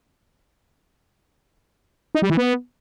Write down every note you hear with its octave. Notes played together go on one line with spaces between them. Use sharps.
D#4
G3
E3
B3